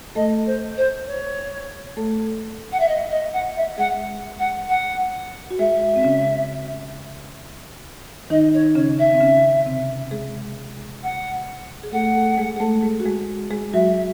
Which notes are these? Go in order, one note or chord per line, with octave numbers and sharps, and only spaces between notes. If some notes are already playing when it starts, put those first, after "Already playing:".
A3 A4 D#5
C5
C5
C#5
A3 A4
F#5
E5
D#5
D#5
F#5
E5
G#3 G#4 F#5
F#5
F#5
F#4
G#3 G#4 E5
C4
C#3 C#4
D#3 D#4 D#5
C#5
C#3 C#4 C#5
E5
C4
C#3 C#4
C3 C4
G#3 G#4
F#5
G#4
A3 A4 F#5
A3 A4
G#3 G#4
G#4
A3 A4
G#3 G#4
F#4
G#3 G#4
G#3 G#4
F#3 F#4 E5